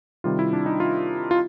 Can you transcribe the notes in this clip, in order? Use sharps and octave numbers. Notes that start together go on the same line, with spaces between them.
C3 D#3 G3 F4
E4
D4
D#4
F4
F4